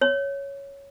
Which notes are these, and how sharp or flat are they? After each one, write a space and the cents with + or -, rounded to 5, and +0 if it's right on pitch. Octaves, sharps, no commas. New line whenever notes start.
C#5 +5